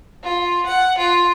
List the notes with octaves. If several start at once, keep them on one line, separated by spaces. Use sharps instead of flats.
F4
F#5
F4